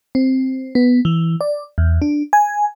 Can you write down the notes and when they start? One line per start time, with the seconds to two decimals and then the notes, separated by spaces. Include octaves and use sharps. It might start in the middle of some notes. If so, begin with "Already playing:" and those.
0.15 C4
0.75 B3
1.05 E3
1.41 D5
1.78 E2
2.02 D4
2.33 G#5